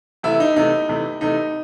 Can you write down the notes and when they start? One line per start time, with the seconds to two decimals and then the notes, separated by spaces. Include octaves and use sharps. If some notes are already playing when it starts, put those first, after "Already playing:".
0.23 C3 E3 A3 E4
0.40 D#4
0.56 C3 E3 A3 D#4
0.89 C3 E3 A3
1.21 C3 E3 A3 D#4